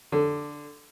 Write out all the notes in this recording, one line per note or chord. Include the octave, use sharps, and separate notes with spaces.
D3